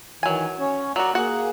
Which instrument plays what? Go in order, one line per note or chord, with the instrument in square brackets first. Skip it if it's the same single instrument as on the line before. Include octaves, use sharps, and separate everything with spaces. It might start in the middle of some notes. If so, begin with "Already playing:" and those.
[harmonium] D#3 E3 [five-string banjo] F#3 G#5
[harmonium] C#4 C#5
[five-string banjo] F#3 F#4 [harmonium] A#4 D5
[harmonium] A#3 G#4 [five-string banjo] F#4 F#5